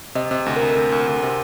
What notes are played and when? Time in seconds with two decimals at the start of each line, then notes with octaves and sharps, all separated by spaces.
0.15 C3 D#5
0.31 C3
0.46 D2
0.56 D2 A#4
0.76 D2
0.92 D2
1.07 D2
1.23 C3